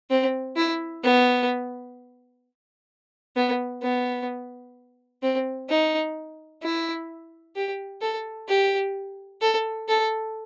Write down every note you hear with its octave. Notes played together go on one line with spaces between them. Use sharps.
C4
E4
B3
B3
B3
C4
D#4
E4
G4
A4
G4
A4
A4